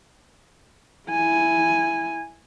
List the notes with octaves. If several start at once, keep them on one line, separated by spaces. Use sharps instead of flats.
E4 G#5